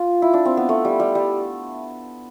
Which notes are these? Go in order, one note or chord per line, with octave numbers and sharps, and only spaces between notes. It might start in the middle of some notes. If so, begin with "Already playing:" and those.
Already playing: F4
E4
D4
C4
B3
A3
G3
G3
G3